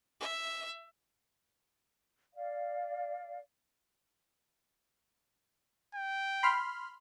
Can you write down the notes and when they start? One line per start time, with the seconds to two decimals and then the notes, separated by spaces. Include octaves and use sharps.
0.20 E5
2.34 D5 F5
5.95 G5
6.43 B5 C6 F6